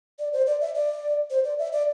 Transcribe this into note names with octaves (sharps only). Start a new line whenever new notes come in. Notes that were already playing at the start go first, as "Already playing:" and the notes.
D5
C5
D5
E5
D5
C5
D5
E5
D5